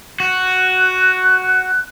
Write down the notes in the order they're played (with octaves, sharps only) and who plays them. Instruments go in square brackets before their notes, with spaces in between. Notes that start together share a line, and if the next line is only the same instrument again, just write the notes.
[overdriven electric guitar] F#4 [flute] F#6